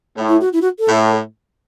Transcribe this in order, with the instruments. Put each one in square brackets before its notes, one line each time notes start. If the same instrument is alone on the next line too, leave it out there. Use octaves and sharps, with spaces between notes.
[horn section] A2
[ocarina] E4
F#4
E4
F#4
A4
[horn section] A2